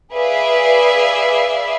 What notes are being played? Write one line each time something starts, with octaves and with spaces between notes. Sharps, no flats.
G#4 B4 D5 E5 F5